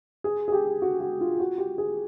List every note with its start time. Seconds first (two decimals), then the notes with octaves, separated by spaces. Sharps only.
0.24 G#4
0.48 G#4
0.52 G4
0.82 F#4
1.01 F#4
1.21 F4
1.40 F#4
1.58 G4
1.78 G#4